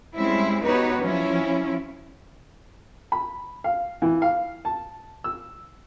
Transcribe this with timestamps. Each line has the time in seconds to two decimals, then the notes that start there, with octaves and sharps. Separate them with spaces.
0.15 G3 G#3 C4 C#4 E4
0.64 B3 D#4 F#4 G4 B4 C#5
1.03 F3 F#3 C#4 E4
3.12 B5
3.64 F5
4.02 E3
4.22 F5
4.65 A5
5.24 E6